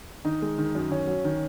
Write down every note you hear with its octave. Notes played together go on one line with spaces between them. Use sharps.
D#3 D#4
G#3
D#3
F#2
D#3 C#4
F#3
D#3